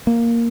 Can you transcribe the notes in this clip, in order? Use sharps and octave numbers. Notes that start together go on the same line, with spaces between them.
A#3